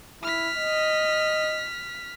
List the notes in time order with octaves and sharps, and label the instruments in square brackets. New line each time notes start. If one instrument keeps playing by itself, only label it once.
[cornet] E4 [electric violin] F6 B6
[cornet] D#5